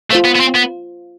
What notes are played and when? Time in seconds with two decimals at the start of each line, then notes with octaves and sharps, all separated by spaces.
0.11 A3 F4 C5 F5
0.25 B3
0.36 B3
0.41 C4
0.55 B3